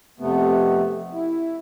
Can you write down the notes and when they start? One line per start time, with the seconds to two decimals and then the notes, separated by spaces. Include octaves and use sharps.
0.20 F2 C3 A3 B3
1.13 E4